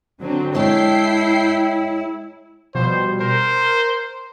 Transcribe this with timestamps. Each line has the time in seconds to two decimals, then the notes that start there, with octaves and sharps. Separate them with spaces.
0.21 D3 F#3 C4
0.55 G#3 E4 C#5 G5 A5 C7
2.75 B2 F3 G3 C5
3.20 A#4 C5